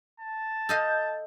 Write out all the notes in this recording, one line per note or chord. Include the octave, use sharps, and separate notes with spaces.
A5
A4 D#5 F5 G6